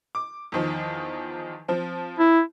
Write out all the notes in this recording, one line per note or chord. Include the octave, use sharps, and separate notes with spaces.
D6
E2 D#3 F3
F3 C4
E4